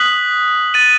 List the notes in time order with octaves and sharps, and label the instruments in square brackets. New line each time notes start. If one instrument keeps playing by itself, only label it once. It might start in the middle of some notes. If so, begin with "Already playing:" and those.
Already playing: [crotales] D#6 F#6 B6 F#7
A6 D#7 F#7